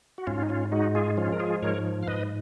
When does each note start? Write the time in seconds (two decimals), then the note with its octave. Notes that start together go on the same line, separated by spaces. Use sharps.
0.18 F#4
0.27 G#2 C#4 F4
0.43 D#4
0.49 C#4 F4
0.72 G#3 D#4 F#4
0.95 F4 G#4
1.17 F3 C#4 F4
1.33 A#4
1.40 F4 G#4
1.62 G#2 A#4 C#5
2.03 F5
2.08 G#2 B4 D#5